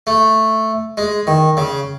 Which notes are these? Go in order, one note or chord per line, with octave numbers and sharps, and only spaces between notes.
A3
G#3
D#3
C#3